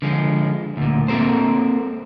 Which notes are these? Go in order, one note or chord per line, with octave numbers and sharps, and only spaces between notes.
D3 F3 G#3
D2 A#2
A#3 C4 A4 A#4 C5